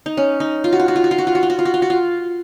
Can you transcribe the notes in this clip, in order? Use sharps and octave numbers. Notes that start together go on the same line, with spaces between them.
D#4
C#4
D#4
F4
F#4
F4
F#4
F4
F#4
F4
F#4
F4
F#4
F4
F#4
F4
F#4
F4
F#4
F4